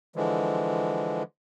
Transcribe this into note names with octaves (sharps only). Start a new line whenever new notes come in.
D3 E3 F3 G#3